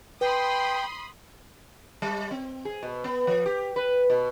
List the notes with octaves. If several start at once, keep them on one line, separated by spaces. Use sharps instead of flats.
B4 G5 B5 C6 D#6
G3
C4
G#4
B2
B3
F3
G4
B4
B2